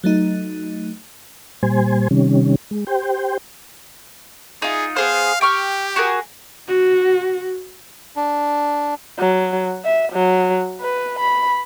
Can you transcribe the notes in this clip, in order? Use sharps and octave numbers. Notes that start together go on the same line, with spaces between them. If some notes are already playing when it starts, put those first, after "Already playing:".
F#3 A3 D#4
A#2 G3 C5 G#5
C3 D#3 G3 C#4
G#3
G4 C5 G5
D#4 F4 G#4
B3 G#4 C5 F5
G4 G5 C#6 F6
F#4 G#4 A#4
F#4
D4
F#3
E5
F#3
B4
B5